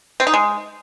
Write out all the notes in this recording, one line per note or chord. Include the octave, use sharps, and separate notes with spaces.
C4
D#4
G#3